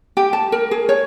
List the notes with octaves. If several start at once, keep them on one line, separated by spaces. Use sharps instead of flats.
G4
A5
A#4
G#4
C#5